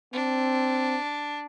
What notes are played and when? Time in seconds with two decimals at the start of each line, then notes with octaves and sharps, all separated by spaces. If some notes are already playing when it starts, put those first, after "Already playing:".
0.14 C4 D4